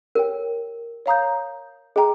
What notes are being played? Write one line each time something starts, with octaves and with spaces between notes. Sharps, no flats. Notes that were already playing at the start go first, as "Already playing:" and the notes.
G4 A#4 C#5 G5
C#5 F5 A#5 D#6 G6
G#4 D#5 G5 A#5